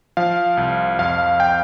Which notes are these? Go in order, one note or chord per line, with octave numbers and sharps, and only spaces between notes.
F3 F5
C2
F2 F5
G5